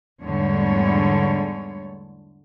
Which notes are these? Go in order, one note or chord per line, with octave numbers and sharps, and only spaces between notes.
E2 G#2 D3 G3 A3 C#5